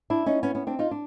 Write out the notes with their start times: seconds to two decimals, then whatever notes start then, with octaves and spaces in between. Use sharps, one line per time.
0.10 D4 E4
0.26 C#4 D#4
0.43 B3 C#4
0.55 B3 C#4
0.67 C4 D4
0.79 D#4 F4
0.91 D4